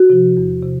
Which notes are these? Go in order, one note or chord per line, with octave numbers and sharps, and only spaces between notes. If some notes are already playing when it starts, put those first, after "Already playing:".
Already playing: F#4
C3 F3
E2
C3